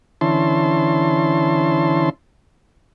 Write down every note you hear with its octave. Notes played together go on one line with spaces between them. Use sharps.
D3 E3 C#4 E4 A5 C6